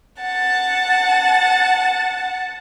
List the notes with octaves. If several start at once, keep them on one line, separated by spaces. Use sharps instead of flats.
F#5 A5